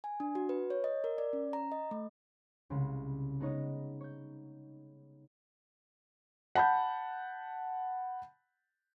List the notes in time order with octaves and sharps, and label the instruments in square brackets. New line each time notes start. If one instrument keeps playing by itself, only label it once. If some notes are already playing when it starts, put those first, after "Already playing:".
[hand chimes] G#5
D4
F#4
B4
C#5
D#5
A#4
D5
C#4
A#5
D#5
A3
[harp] C2 C#3 G#3 C6
G#3 B3 D#4 C#5 D#5
C#5 G6
[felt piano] F#5 A5 B5 G6